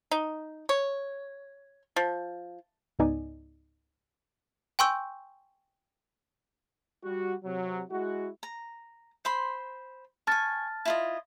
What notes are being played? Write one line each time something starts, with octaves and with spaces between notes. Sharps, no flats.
D#4
C#5
F3
C#2 G#2 B3 D#4 D5 G#5
G5 G#5 C6 C#6 E6 G6
G3 F#4
C3 F#3
G#3 E4 F#4
A#5
C5 B5 C6
G#5 A5 C#6 F6 A6
E4 F4 D#5